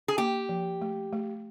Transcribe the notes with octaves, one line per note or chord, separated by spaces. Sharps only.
G#4
A#3 G4
F3
A3
A3